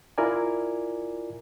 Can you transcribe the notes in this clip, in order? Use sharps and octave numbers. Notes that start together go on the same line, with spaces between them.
E4 F4 A#4 D5 G#5